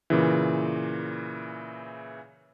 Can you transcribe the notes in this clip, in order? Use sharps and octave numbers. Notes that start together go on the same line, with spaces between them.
A#2 C#3 E3